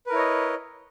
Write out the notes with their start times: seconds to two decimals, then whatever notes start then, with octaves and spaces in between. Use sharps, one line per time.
0.06 B4
0.09 A#4
0.12 E4
0.15 C#5
0.18 D#5